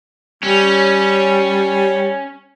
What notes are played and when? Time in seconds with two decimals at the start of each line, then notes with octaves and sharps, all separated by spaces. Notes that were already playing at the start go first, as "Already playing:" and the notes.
0.44 G3 C#4